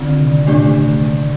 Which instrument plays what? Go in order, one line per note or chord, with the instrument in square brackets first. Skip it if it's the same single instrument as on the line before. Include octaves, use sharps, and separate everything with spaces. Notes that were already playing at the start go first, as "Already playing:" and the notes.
Already playing: [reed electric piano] D3 D#3 [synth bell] C4 F4 D5
[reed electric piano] C3
[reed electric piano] A#2 [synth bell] A3 D4 G4 D5